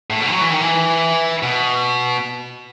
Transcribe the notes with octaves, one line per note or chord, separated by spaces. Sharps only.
A2
B2
F#3
E3
D#3
E3
B2